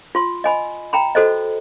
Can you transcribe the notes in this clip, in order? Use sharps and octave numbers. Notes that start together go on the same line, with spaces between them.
F4 C6
D#5 G#5 B5
G5 A#5 B5
F#4 A4 C5 D#5